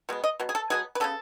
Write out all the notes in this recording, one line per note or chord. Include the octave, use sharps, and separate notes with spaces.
B2 G#3 B3
D#5
B2 F#3
G#4
A4
B2 F#3 B3 G#4
B4
C#3 G#3 B3 A4